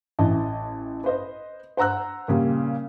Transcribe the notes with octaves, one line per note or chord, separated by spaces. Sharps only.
A1 E3 D#5 A5
B4 C5 D#5
C5 F#5 A#5 E6 F#6
A#2 C#3 G3